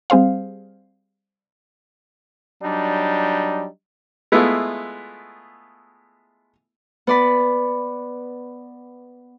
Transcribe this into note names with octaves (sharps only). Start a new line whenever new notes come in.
G3 C4 G#4 C5 F5
F#3 G3 D4 D#4
G#3 A3 B3 E4 F4
B3 D5 B5